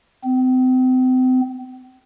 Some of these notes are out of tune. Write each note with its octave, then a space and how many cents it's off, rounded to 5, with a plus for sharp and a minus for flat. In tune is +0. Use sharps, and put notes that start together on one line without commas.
C4 -35